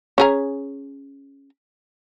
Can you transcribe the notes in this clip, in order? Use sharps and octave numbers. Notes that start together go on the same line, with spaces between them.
C#4 G#4 A#5